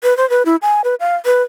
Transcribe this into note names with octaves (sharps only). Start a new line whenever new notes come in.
B4
C5
B4
E4
G#5
B4
F5
B4